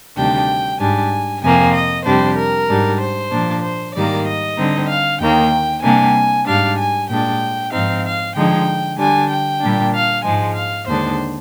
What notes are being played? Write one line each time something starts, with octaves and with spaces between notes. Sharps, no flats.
D2 C3 D#3 G3 D4 G5
G#2 G3 D4 G#5
F2 C3 F3 A#3 G#5
D#5
F2 C3 G3 D4 C5
A#4
G#2 G3 D4
C5
A#2 F3 A#3 D4
C5
G#2 D#3 G3 A#3 D5
D#5
D3 G3 C4 D#4
F5
D#2 D#3 A#3 G5
C3 G3 A#3 D4 G#5
G#2 G3 D4 F5
G#5
A#2 G#3 D4 G5
G#2 F3 C4 D#4 F5
F5
D3 F3 G#3 D#4 G5
D3 G3 D4 G#5
G5
A#2 G3 A#3 D4
F5
G#2 F3 G#3 G#5
F5
D#2 D3 G#3 D4 C5